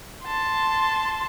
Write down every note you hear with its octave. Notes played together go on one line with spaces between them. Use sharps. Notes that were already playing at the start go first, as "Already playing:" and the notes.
A5 C6